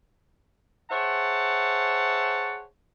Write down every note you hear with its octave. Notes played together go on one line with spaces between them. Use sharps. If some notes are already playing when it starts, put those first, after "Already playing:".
G#4 C5 C#5 E5 F#5 A5